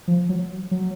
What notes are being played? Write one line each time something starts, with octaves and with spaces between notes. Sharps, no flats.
F3
F#3
F#3